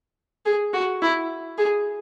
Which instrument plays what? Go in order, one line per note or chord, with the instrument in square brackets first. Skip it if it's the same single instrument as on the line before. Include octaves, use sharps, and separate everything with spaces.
[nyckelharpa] G#4
F#4
E4
G#4